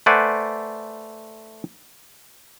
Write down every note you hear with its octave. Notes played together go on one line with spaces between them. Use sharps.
A3 B4 C5 D5 F#5 G#5